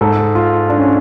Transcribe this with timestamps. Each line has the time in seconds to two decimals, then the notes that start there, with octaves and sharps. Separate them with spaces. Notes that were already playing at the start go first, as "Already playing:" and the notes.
0.01 G#2 A4
0.35 F4
0.70 D4
0.78 C#4